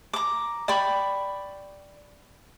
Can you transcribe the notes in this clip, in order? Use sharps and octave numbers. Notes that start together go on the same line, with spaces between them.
A#5 D6
D5 G5 B5 C#6